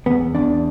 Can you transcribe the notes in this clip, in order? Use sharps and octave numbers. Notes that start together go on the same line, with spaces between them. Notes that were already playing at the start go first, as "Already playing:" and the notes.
E2 B3
E2 D4